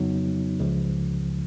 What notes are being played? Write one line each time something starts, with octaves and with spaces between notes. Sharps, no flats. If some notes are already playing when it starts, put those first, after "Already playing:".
Already playing: F2 C#3 F#3 B3 D#4
C#2 C#3 F3